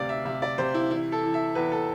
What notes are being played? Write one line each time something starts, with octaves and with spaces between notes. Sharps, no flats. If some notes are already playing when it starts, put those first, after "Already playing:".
Already playing: D2 C3 D5 F5
E5
C3 E5
D5
C3 C5
E4
E3 E4
A4
E3
E5
E2 B4
A4